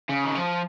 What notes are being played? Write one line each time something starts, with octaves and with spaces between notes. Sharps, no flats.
C#3
D#3
F3